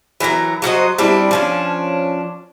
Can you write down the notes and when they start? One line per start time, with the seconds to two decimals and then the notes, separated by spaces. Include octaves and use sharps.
0.20 E3 F#3 A#4 A#5
0.62 F#3 F#4 C5 D#5
0.98 G3 C4 D4 E4
1.31 F3 C#4 D4